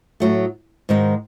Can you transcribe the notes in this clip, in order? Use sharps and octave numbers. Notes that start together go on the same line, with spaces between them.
A2 F#3 A3
G#2 D#3 G#3